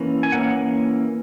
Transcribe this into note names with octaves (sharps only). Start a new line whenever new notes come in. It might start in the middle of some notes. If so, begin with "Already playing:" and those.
Already playing: E3 A#3 C#4
G#5
E3 A#3 C#4 F#5